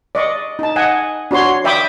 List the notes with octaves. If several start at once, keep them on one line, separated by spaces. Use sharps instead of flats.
D5 D#5 C#6
D#4 A5
D#5 F#5 G#5
D4 F#4 C#5 C6
D5 E5 G5 B5 D6 D#6